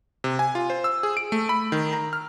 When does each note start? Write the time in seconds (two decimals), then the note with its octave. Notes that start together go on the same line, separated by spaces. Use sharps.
0.24 C3
0.39 G#5
0.55 F4
0.70 C5
0.84 E6
1.03 G#4
1.17 D7
1.32 A3
1.49 B5
1.72 D#3
1.93 A#5
2.13 F6